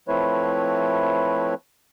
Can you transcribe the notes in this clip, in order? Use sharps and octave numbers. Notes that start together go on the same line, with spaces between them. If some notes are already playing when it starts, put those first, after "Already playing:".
F3 A3 C4 E4 B4 C#5